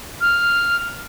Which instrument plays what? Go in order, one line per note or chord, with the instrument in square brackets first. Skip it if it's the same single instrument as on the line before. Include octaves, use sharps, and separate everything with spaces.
[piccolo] F6